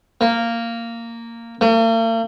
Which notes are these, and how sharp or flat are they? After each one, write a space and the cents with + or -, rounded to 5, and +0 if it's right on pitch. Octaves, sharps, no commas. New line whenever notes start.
A#3 -10
A#3 -45